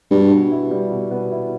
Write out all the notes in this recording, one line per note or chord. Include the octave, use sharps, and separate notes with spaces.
G2 B2
B3
E4
G3
B2
B3
E4